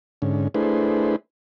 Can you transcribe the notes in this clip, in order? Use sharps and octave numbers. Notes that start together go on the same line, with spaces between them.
G#2 D3 C#4
A3 D4 E4 G#4 B4 C5